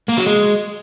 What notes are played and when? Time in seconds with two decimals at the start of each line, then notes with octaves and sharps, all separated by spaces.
0.08 A#3
0.17 F#3
0.26 G#3